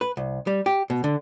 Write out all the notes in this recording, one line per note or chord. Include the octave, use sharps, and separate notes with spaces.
B4
C2
G3
G4
B2
D3